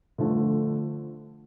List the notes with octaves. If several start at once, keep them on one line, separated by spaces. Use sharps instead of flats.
D3 F3 A3